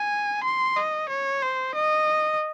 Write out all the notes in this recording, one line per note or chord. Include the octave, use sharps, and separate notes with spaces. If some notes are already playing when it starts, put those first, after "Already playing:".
Already playing: G#5
C6
D#5
C#5
C5
D#5